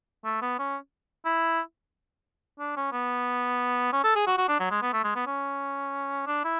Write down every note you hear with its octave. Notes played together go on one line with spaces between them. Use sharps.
A3
B3
C#4
E4
D4
C#4
B3
C#4
A4
G#4
F#4
F#4
D4
F#3
G#3
B3
A3
G#3
B3
C#4
D4
E4